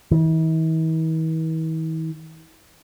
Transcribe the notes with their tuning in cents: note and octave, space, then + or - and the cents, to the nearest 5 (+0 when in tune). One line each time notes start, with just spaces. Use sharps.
E3 -45